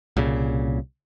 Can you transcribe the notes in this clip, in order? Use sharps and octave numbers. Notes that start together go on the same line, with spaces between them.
C2 A#2 C#3